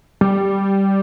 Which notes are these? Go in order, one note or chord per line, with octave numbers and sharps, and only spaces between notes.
G3